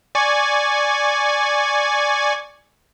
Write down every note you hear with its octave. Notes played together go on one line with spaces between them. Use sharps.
D5 G#5 C#6